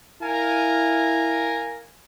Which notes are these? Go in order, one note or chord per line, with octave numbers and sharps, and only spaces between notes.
E4 A#4 F5 G#5